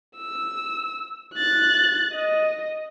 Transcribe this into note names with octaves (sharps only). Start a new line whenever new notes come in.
E6
F#6 A6
D#5